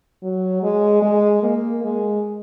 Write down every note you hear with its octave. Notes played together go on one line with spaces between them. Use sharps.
F#3
G#3
G#3
A#3
G#3